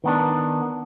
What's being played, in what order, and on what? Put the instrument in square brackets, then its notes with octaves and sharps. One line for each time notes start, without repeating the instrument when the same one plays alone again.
[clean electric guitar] D#3 B3 D4